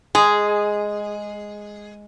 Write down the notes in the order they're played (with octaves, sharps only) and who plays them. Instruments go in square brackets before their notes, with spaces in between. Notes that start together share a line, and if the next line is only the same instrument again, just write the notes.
[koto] G#3 [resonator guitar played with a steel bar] G#4